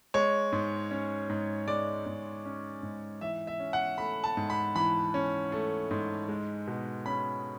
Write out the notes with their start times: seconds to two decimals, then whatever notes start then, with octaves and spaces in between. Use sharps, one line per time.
0.14 G#3 C#5
0.52 G#2
0.91 C#4
1.29 G#2
1.67 G#3 D5
2.06 G#2
2.45 C#4
2.83 G#2
3.21 E3 E5
3.47 E5
3.60 C#4
3.73 F#5
3.98 A3 B5
4.24 A5
4.37 G#2
4.50 B5
4.75 E3 B5
5.14 C#4
5.52 A3
5.91 G#2
6.28 G#3
6.67 B2
7.06 C#4 B5